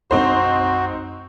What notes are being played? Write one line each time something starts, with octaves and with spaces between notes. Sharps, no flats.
B1 F#2 G#3 C4 D#4 F#4 C5